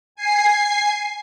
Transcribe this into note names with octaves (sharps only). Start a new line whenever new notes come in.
G#5 C7